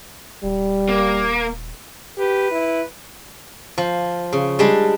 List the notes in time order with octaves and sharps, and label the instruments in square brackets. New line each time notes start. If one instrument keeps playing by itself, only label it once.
[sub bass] D#1 [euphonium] G3
[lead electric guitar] A#3
[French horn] G4 [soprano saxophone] B4
[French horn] E4
[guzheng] F3
C#3
G3 G#3 D4